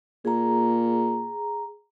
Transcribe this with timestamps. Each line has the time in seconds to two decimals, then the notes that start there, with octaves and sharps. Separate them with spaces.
0.25 A#2 G#4 A#5